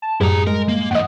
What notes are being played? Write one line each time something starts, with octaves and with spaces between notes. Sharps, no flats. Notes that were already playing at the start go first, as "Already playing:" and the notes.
A5
F#2 A2 G3 E4 G#4 A#5
G#3 A#4
A#3
G#2 E3 D#5 F#5